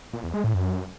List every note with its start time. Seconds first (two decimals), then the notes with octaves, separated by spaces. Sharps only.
0.13 A#2
0.24 E2
0.34 G#3
0.44 A2
0.54 F#2